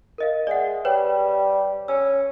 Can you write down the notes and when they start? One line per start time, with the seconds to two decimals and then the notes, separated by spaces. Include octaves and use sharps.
0.18 A#4 D#5 F5
0.47 G#3 D5 E5 F#5
0.85 G3 B4 C#5 G5
1.88 C#4 E6